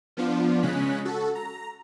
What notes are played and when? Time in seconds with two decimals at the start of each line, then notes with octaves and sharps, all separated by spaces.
0.17 F3 B3 D4 F4
0.63 C#3 G#3 C#4 F#6 B6
1.05 F#4 A4
1.35 A#5